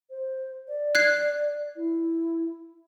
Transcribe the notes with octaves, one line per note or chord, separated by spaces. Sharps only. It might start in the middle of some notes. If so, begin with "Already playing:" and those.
C5
D5
F#6 G#6 C7
E4